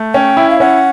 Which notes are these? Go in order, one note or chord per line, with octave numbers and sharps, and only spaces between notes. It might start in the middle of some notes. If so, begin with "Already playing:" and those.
Already playing: A3
C#4 G5
E4
F5
C#4 F#5